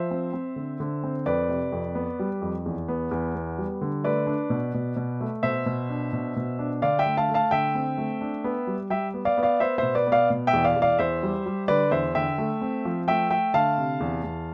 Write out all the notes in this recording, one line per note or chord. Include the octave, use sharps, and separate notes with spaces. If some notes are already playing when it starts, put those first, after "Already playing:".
Already playing: F3 C5 E5
C4
C4
D3
D3
C4
F2 B4 D5
C3
F2
B3
G3
F2
E2
B3
E2
B3
G3
D3
A3 B4 D5
D4
B2
B2
B2
A3
B2 C5 E5
B2
D4
B2
B2
D4
D3 D5 F5
E5 G5
A3
F5 A5
A3
F5 A5
D3 E5 G5
C4
A3
D4
B3
G3
G3 E5 G5
B3
D5 F5
B3
D5 F5
B3 C5 E5
B2 C5 E5
B4 D5
B3
D5 F5
B2
E5 G5
E2
D5 F5
E2
D5 F5
E2 C5 E5
G3
G3
D3 B4 D5
E2 C5 E5
D3 E5 G5
A3
C4
F3
A3 E5 G5
A3 E5 G5
D3 F5 A5
C3
E2
E2